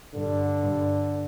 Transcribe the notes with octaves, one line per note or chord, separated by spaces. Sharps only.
G2 D3
G2